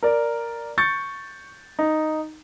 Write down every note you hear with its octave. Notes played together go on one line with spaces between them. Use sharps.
A#4 D5
C#6 G6 A6 C#7
D#4